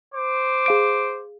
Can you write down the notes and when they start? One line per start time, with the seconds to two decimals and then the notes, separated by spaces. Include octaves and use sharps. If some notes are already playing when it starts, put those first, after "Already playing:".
0.12 C5 D6
0.66 G#4 F5 D7